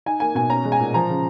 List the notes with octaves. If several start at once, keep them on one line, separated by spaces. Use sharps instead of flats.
D#4 G#5
A#3 G#5
B2 G#5
C#4 A#5
G#3
G#5
A#2
F3 A#5
C#3